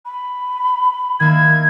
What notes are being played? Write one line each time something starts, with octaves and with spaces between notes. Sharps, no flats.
B5
D#3 A#3 E5 G#6